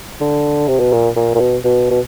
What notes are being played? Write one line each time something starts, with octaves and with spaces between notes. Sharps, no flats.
D3
C3
B2
A#2
A#2
A#2
B2
B2
B2